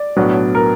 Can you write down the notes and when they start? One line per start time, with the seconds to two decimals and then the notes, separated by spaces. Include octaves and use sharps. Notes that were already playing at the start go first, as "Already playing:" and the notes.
Already playing: D5
0.16 B1 A2 F#3 B3 D4
0.55 A#4